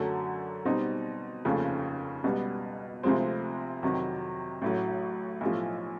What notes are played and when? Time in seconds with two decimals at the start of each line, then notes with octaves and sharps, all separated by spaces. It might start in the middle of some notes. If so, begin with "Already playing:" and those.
Already playing: F#2 D3 F#3 A3
0.65 B2 G3 C4 D#4
1.45 F1 D#2 C#3 F3 A3
2.24 C#2 B2 G3 B3
3.03 D2 C3 F3 G#3 C4
3.83 F2 C3 D#3 F#3
4.62 A1 A2 F#3
5.41 B1 A2 F3